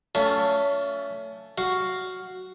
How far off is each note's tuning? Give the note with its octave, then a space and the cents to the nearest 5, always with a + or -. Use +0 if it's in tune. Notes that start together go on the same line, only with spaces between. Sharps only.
A3 +15 C#4 +30 F4 +0
F#4 +0 F5 +0